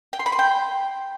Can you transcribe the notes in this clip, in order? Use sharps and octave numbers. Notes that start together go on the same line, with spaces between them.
G5
C6
B5
C6
G5